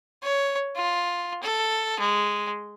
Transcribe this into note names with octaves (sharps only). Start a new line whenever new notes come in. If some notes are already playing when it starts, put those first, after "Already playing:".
C#5
F4
A4
G#3